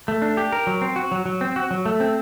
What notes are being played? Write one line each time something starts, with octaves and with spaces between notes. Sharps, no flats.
A3
D4
G4
A#4
F#3
C4
F#4
F#3
F#3
C4
F#4
F#3
A3
C4